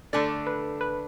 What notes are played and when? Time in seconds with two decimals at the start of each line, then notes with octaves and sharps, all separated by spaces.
0.13 D3 A3 D4 A4 D5
0.47 B4
0.81 B4